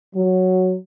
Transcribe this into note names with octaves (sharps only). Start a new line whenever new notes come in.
F#3